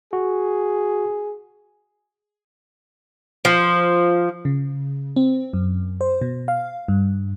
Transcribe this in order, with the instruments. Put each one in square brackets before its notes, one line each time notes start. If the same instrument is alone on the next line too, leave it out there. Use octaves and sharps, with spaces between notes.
[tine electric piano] F#4 [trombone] G#4
[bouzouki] F3
[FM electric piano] C#3
C4
F#2
C5
B2
F5
G2